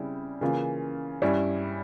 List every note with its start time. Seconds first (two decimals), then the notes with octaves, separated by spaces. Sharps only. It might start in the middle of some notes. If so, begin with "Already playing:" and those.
Already playing: C#3 G3 C4 E4
0.41 C#3 E3 A#3 F4
1.22 G2 G3 C#4 E4